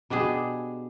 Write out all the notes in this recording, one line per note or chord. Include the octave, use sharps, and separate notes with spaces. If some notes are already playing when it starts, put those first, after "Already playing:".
B2 D4 G4 G#4